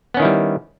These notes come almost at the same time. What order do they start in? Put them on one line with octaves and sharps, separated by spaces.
B3 C#4 D#3 E4 G3